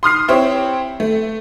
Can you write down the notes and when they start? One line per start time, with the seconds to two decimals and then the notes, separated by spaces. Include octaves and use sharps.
0.03 C6 D#6 F6 C7
0.28 C4 E4 G4 C5 C#5
1.00 A3